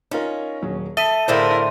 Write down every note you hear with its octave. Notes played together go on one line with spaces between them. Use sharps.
C#4 D#4 F4 A#4
D#1 F#3 G#4
A4 E5 D#6 B6 D#7
A2 D3 E4 G#4 A#4 C5 F5 A6